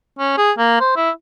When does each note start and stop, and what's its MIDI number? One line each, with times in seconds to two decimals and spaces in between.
0.19 0.38 61
0.38 0.52 68
0.58 0.80 58
0.80 0.95 72
0.96 1.10 64